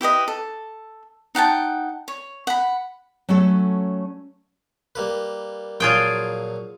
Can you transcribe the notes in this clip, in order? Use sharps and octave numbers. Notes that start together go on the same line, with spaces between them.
E4 G4 B4 D#5
A4
D#4 F#5 G5 A5
C#5
F#5 B5
F#3 A3 C#4 F#4 A4 C#5
G3 A#3 B4
A#2 F3 F#3 F4 G#4 G5